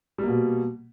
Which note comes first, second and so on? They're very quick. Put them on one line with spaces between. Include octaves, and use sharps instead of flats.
G3 A#3 B2